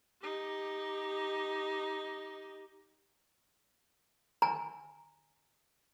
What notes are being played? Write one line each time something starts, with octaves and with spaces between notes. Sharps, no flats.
D#4 G4
G#5 A#5